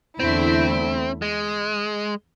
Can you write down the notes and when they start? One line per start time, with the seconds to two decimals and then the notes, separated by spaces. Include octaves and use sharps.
0.20 E2 D3 A3 C4 E4
1.22 G#3